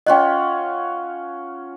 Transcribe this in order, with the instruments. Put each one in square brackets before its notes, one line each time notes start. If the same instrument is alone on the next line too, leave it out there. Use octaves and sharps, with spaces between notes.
[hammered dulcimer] C#4 F4 F#5 [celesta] D#5 G5